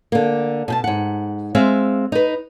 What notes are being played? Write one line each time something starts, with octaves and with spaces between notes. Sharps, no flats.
D3 A#3
B2 G5 A5
G#2 F#5
G#3 C4 E5 F5
D#4 B4